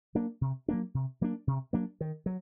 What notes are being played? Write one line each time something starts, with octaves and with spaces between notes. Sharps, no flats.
F#3 A#3 D4
C3
F#3 A#3 D4
C3
F#3 A#3 D4
C3
F#3 A#3 D4
D#3
F#3